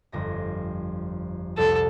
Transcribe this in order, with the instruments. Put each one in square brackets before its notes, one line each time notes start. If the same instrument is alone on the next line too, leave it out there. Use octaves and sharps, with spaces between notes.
[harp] G1 F2 A#6
[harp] C2 F2 [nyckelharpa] A4